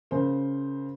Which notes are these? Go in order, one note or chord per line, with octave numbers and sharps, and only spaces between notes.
C#3 A#4 C5